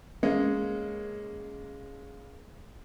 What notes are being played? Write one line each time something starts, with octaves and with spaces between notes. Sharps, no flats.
G#3 A#3 C#4